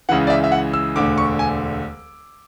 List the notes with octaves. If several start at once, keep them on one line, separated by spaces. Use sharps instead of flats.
C#2 C#3 E3 F#5
D5
E5
E5
F#5
E6
E1 D2 D3 D6
C#6
G#5